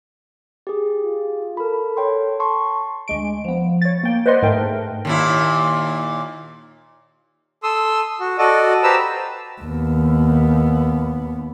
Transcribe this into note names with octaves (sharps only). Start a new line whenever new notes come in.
G4 G#4
F4
A4 A#4 B5
C#5 G5 C6
A5 C6 C#6
D2 G#3 D7
F3 B3
C#5 A6
A#3 G5
B4 C5 D5 D#5 F#5 C6
G#2 A3 A#4 G5
D#2 A#2 E4
A4 C6 D#6 E6
F#4
F#4 A4 D5 D#5
G4 B4 C5 A5 A#5 E6
D#2 B3